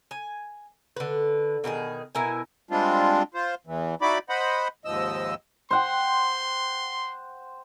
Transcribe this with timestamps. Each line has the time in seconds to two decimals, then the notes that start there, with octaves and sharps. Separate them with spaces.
0.11 G#5
0.96 D3 B4
1.64 B2 D#3 G4 G#4
2.15 B2 E4 A#4 G#5
2.71 G3 G#3 C4 D4 F4
3.34 F4 C5
3.67 E2 E3
4.02 D#4 E4 F#4 D5 B5 D6
4.29 C5 D#5 F#5 B5
4.85 D#2 G#2 F3 D#5 E6
5.71 C5 F#5 G5 C6